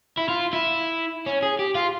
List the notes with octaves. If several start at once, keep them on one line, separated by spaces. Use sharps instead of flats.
E4
F4
E4
C#4
G#4
G4
F4